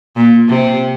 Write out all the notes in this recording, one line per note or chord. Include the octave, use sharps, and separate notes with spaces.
A#2
C3